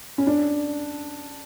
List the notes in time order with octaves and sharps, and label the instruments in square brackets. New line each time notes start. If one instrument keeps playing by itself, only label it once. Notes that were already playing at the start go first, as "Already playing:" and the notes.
[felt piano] C#4
D4